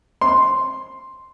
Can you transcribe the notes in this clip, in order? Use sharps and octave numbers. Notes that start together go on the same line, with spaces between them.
C6